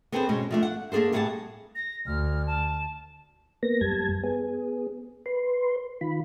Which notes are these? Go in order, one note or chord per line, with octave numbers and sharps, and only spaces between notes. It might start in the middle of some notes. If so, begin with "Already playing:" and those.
B3 C4 G#4 A4 B4 C5
B2 G#3 C#4
F3 A3 D4
F#5
A#3 D4 G#4 A4 C5
A2 G3 G#4 F5 F#5 A5
A#6
D2 F6
A5
A#3 B3 A#6
F#2 G3 A5 G#6
B3 G#4
B4 C6
D#3 F4 B5